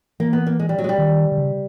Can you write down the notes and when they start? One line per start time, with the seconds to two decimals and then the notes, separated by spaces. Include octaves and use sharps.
0.20 E3 A#3
0.33 B3
0.47 A#3
0.59 G#3
0.69 G3
0.78 F#3
0.84 G#3
0.89 G3
0.98 D#3
1.32 D3
1.38 C#3